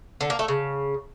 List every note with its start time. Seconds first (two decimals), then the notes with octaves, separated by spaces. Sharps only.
0.21 D3
0.30 A#3
0.39 A3
0.48 C#3